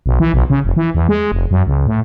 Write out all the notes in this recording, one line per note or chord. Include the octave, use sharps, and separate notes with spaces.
B1
E3
B1
C#3
F1
E3
E2
G#3
F1
F#2
C#2
A2